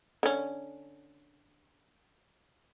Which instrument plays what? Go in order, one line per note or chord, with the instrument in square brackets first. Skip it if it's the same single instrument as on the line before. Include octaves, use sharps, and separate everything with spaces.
[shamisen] D3 C#4